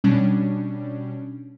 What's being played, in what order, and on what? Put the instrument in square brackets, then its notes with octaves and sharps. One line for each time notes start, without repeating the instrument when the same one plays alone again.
[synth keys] B2 G3 C#4 D4